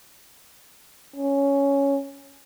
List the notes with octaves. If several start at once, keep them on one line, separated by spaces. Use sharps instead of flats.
C#4